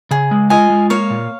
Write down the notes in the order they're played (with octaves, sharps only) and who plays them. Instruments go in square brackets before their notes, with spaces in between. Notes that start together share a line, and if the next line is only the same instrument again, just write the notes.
[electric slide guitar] C#3 [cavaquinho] G#4
[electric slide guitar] G#3
[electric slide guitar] F4 [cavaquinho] D#5 G#5
[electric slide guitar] G#3
[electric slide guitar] A#3 [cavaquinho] C#5 F5
[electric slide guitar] A#2